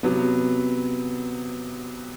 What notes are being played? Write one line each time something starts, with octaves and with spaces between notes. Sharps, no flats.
C3 F#3 B3